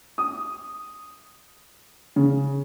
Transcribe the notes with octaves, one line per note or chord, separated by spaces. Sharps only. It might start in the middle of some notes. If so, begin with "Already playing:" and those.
D#6
C#3